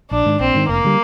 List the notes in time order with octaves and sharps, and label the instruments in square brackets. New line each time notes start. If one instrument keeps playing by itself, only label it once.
[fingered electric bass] A#1 [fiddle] D4
[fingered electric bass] G#2 D#3
[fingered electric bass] A#1 [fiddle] C4
[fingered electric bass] G#2 D#3
[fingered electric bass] F1 [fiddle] A#3
[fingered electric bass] D3 G3